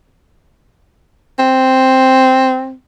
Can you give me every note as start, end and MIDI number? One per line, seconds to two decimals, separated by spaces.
1.39 2.74 60